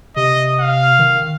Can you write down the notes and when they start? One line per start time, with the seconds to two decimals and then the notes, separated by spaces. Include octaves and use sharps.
0.16 C3 D#5
0.60 F5
0.99 D#3